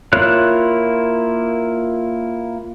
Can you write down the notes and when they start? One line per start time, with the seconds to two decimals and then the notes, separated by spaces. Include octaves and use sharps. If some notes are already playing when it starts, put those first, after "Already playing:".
0.13 A#3 E4 F4 C#5 F#6